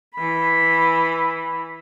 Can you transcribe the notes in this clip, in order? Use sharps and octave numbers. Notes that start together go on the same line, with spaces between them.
E3 B5